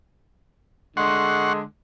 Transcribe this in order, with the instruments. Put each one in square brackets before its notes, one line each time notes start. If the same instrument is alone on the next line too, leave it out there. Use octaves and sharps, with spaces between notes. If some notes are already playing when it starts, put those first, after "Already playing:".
[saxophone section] D3 G#3 [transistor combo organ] F#5 C6 C#6